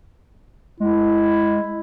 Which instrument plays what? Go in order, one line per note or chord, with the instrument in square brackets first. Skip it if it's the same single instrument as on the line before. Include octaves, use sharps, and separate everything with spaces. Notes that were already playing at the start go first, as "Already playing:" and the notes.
[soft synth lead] G#3 [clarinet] E4